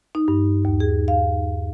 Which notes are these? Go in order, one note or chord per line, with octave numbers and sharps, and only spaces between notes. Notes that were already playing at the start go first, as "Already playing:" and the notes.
D#4
G2
D#2
G#4
F5